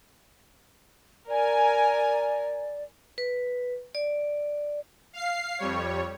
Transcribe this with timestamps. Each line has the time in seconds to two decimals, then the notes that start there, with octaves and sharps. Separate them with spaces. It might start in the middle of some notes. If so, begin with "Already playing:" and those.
1.28 A#4 D5 G#5
3.18 B4
3.95 D5
5.13 F5 C7
5.59 F2 G3 C#5